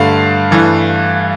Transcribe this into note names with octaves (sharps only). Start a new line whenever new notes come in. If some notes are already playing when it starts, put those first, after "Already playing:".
Already playing: G2 D3 A3 F5
G2 E3 A3